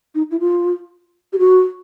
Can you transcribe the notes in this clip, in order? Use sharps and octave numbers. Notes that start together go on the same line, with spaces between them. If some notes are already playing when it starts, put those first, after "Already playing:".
D#4
E4
F4
G4
F#4